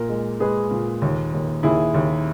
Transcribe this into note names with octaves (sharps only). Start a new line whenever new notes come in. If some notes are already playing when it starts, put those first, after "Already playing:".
Already playing: A#2 A#4
G#3
G#3 G#4 B4
A#2
D#2
D#2
D#2 E4 G#4
D#2